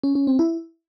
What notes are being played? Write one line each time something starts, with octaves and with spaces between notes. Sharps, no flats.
C#4
C#4
C4
E4